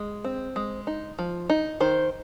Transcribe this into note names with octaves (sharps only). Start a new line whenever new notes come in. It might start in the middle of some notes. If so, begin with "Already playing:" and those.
Already playing: G#3
C4
G#3
D#4
F3
D#4
D#3 C5